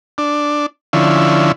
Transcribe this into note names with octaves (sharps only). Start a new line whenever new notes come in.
D4
D3 F3 C#4 E4